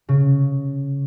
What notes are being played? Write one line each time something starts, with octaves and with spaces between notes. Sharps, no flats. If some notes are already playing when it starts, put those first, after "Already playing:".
C#3